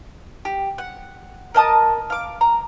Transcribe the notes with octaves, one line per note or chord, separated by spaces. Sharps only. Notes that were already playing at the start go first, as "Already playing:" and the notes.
G4
F#5
A#4 D#5 A5 D#6
F5 D6
A#5